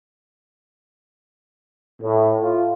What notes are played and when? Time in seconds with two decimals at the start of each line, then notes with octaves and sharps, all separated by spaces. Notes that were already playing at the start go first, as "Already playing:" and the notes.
2.03 A2
2.41 F4